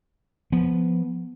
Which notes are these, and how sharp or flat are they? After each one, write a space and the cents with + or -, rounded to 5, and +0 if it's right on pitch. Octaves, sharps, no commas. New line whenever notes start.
F3 +0 B3 +0